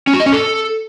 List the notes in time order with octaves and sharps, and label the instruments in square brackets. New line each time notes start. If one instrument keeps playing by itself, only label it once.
[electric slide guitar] C#4
F#4
D#5
C#4
A4